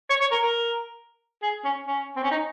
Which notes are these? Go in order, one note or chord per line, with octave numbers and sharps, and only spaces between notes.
C#5
C#5
A#4
A#4
G#4
C#4
C#4
C4
C#4
D#4